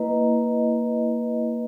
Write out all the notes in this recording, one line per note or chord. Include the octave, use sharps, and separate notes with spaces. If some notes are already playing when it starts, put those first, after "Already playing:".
Already playing: A#3 E4 B4 D#5